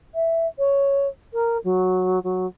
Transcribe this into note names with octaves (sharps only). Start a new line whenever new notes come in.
E5
C#5
A#4
F#3
F#3